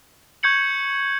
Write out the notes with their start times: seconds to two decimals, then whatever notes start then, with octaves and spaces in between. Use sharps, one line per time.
0.43 C#6 G6 G#6 C#7 F#7